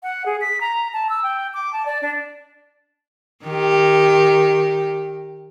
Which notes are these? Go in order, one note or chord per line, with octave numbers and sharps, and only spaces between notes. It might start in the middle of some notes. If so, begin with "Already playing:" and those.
F#5
G#4
B6
A#5
A5
E6
G5
D6
A5
D5
D4
D#3 G4